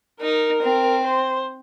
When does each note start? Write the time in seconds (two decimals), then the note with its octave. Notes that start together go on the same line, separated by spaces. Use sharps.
0.21 D#4 A#4
0.62 C4
1.03 C5